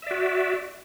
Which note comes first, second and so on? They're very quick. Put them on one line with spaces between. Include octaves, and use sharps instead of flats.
E5 D5 F#4